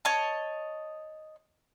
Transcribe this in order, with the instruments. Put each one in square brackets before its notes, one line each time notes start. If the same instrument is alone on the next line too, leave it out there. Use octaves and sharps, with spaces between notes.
[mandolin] C#5 D#5 A5